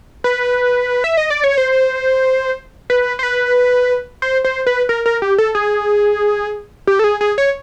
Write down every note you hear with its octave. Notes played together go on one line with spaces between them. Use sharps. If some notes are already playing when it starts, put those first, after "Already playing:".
B4
E5
D#5
D5
C#5
C5
B4
C5
B4
C5
C5
B4
A#4
A#4
G4
A4
G#4
G4
A4
G#4
G#4
C#5